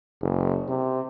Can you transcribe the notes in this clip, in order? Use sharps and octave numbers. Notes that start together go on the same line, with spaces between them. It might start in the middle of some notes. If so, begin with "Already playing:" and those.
F#1
C3